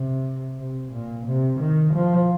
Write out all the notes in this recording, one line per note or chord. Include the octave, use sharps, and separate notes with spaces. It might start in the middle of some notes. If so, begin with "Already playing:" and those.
Already playing: C3
C3
A#2
C3
D#3
F3